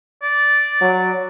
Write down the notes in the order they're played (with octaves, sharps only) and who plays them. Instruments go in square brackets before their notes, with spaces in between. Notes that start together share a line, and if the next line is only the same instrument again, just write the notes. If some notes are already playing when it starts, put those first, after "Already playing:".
[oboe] D5
[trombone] F#3